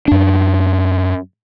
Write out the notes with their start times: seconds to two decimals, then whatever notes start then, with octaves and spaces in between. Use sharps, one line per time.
0.08 F#2 D4